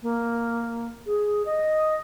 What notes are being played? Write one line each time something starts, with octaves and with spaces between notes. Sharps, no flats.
A#3
G#4
D#5